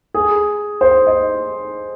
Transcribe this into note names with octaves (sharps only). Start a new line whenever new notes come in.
G#4
C5
D#5